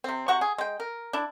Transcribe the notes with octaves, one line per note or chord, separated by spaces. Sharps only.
C3 C4
C3 F#4 F#5 C#6
G#4
G#3 G5
A#4
D4 E4